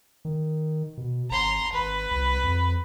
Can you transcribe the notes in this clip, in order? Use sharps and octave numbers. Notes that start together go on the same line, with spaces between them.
D#3
B2
G#1 A#5 C6
G#1 B4
C2
F2